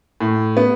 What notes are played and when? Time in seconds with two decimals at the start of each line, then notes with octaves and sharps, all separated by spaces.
0.21 A2
0.57 B3